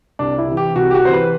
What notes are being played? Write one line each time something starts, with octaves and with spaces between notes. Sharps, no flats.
C2 D4
E4
C3 E3
G4
C2 F#4
G4
F#4
C3 E3 B4 C5